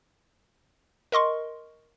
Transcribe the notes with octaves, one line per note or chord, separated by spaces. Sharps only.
A#4 D#5 C6 C#6